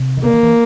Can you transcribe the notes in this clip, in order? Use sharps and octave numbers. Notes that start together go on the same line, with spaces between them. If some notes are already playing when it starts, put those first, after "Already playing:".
Already playing: C3
D#3
D3 A#3
D#3
E3